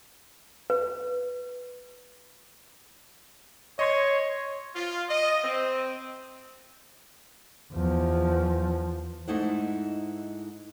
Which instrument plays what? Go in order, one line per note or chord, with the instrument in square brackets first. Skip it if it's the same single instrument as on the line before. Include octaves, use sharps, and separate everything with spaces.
[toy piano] B4
[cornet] C#5 [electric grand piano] D#5 C6 G#6
[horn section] F4
D#5
C4
[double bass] E2 F3
[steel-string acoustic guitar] G#2 A3 D#4 E4 F#5